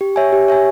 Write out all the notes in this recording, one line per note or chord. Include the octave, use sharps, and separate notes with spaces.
G4
C#5 E5 G#5
G4
C#5 E5 G#5